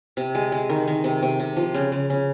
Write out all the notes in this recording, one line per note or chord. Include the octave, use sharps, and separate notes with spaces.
C3
G#3
G#3
D#3
D#3
C3
C3
C3
F3
C#3
C#3
C#3